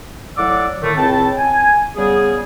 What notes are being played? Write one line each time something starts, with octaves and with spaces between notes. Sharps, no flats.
A2 F#3 D5 F#5 D6 E6
A2 D#3 A3
C#2 A2 C4 G5 A5
G#5
C#3 G3 B3 G#4